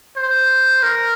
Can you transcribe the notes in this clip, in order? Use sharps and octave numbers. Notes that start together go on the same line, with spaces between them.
C5
A#4